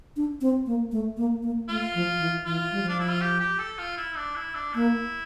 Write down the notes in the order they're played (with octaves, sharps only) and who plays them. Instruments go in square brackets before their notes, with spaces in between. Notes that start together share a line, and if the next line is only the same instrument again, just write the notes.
[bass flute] D4
C4
A#3
A3
A#3
A#3
[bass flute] A3 [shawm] F4
[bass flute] F3
E3
[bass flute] E3 [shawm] F4
[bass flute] G3
F3
[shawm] D4
E4
F4
G4
G4
A4
F4
E4
D4
E4
D4
[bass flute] A#3 [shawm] E4